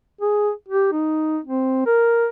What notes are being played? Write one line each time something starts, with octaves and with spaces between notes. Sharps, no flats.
G#4
G4
D#4
C4
A#4